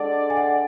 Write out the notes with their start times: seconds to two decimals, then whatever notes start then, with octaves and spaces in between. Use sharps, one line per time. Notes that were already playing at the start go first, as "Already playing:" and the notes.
Already playing: G#3 D4 A4 D5 F#5
0.30 G#5
0.37 F#5